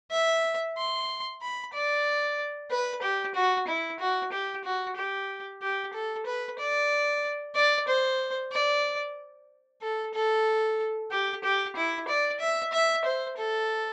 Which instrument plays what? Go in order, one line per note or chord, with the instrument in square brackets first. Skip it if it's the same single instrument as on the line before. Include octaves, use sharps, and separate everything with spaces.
[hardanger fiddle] E5
C6
B5
D5
B4
G4
F#4
E4
F#4
G4
F#4
G4
G4
A4
B4
D5
D5
C5
D5
A4
A4
G4
G4
E4
D5
E5
E5
C5
A4